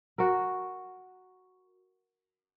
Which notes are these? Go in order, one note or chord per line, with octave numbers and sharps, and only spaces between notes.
F#4 A#4